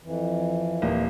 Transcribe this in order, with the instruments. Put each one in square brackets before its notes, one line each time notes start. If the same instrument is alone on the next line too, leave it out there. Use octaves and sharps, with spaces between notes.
[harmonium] F2 E3
[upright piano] D#1 A#3